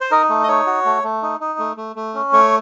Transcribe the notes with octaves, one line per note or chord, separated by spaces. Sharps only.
C5
D#4 A#4
A3
D#5
D#4 C#5
F#4
A3
A3
D#4
D#4
A3
A3
A3
C#4
A3 C#5